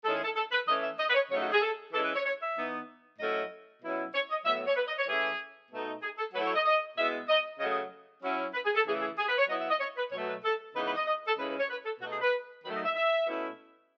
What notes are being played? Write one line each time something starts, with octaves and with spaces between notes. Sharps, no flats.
D#3 G#3 C#4 E4 A4
G#4
A4
A4
B4
E3 A3 C#4 D#5
E5
D#5
B4
C#5
C#3 F#3 A3 D#4 C#5
F#4
G#4
A4
E3 G#3 C#4 E4 A4
B4
C#5
C#5
E5
E3 B3 D#4
A2 F#3 A3 C#4 E4 D#5
B2 F#3 C#4 E4
C#5
D#5
A2 F#3 B3 E5
E5
C#5
B4
D#5
C#5
E3 A3 C#4 E4 G#4
B2 A3 D#4
G#4
A4
F#3 A3 E4 B4
C#5
D#5
D#5
B2 G#3 B3 E4 E5
D#5
C#3 F#3 A3 D#5
D#5
F#3 C#4 E4
B4
G#4
A4
C#3 E3 A3 E4 G#4
G#4
G#4
B4
C#5
F#3 B3 E4 D#5
E5
D#5
C#5
B4
B2 F#3 A3 C#5
B4
A4
C#3 E3 G#3 B3 D#4 B4
B4
D#5
D#5
A4
C#3 G#3 C#4 E4 B4
B4
C#5
B4
A4
B2 A3 D#4 F#4
G#4
B4
D#3 F#3 A3 B4
D#5
E5
E5
B2 A3 C#4 E4